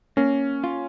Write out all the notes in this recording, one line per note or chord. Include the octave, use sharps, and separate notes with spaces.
A#3 C#4
F4